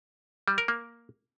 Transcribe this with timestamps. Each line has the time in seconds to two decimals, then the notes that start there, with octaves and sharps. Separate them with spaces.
0.48 G3
0.58 A#4
0.68 A#3